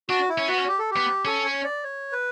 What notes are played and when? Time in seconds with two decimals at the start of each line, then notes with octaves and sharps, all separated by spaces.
0.09 D4 F#4
0.29 E4
0.38 C#4
0.48 B3 F#4
0.58 C#4
0.68 G4
0.79 A4
0.91 G4
0.96 B3
1.25 C#4 A4
1.45 C#5
1.64 D5
1.84 C#5
2.12 B4